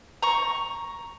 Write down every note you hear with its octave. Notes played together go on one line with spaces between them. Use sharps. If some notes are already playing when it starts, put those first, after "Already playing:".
A#5 C#6